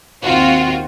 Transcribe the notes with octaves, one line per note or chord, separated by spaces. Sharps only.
D#2 D#3 C4 F4 F#4